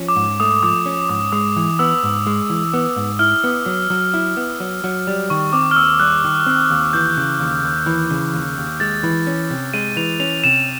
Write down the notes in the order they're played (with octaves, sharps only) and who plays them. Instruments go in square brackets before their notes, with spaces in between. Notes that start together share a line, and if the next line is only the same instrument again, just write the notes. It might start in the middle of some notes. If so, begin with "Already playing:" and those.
Already playing: [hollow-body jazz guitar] F3 C#4
[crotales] D6
[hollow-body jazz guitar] G#2
[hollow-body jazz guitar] A3 [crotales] D#6
[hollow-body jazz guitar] F3 [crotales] D6
[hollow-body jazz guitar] C#4
[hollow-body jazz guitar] G#2 [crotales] D6
[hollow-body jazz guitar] G#3 [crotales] D#6
[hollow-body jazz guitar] E3
[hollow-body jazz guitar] B3 [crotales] E6
[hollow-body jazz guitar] G#2
G#3
E3
B3
G#2
[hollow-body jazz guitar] E4 [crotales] F6
[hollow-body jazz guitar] B3
F#3
F#3
E4
B3
F#3
F#3
G3
[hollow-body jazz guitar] D#3 [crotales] C#6
[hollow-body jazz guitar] C4 [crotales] D6
[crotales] F6
[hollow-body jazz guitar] D#2 [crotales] E6
[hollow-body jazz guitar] G3 [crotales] F#6
[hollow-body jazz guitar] D#3
C4
D#2
[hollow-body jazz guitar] E3 [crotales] G6
[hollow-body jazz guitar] C#3
D#2
D#2
E3
C#3
D#2
D#2
[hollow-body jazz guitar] G#3 [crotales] A6
[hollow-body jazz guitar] E3
C#4
C3
[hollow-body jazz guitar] G#3 [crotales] D#7
[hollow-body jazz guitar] E3 [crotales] F7
[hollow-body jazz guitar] C#4 [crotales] F7
[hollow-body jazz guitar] C3 [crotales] E7